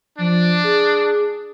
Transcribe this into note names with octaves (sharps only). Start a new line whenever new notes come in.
F3 D4
G#4